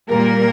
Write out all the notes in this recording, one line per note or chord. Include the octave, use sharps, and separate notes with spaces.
A#2 G3 A#3 A#4